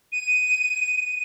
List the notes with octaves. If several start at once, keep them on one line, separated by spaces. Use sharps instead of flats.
D#7